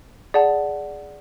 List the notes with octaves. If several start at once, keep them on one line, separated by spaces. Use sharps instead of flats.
G#4 D5 F#5 A5